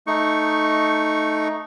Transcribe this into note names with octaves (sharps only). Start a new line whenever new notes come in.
A3 D#4 C#6